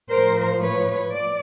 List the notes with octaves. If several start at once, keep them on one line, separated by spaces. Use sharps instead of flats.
A2 F3 A#4 C5
B4 C#5
D5